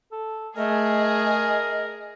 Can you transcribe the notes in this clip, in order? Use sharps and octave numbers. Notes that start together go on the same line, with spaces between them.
A4
A3 G#4 A#4 D#5